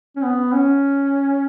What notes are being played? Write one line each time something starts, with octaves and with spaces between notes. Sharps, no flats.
C#4
B3
C#4